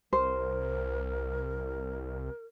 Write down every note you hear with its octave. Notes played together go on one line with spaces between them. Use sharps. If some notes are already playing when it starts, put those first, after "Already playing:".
C2 A#4 C5